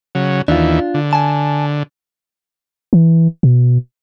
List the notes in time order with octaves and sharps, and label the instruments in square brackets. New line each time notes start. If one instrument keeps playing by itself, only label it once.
[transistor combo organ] C#3 F#3
[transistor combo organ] D#2 E3 [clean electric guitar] D4 F4
[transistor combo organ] D3
[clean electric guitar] G#5 A5
[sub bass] E3
B2